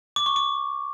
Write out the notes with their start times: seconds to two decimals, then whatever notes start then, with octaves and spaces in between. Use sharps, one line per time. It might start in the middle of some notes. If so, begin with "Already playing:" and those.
0.16 D6
0.26 C#6
0.36 D6